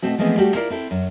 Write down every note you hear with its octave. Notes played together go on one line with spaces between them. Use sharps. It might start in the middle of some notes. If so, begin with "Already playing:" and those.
B2 A3 C4 F#4
E3 F3 G#3 A3 B3 C4
G3 A3 F#4 G4
E4 F4 A#4 D5
C4 E4 A4
F#2